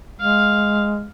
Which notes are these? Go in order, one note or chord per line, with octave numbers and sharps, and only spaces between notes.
G#3 F5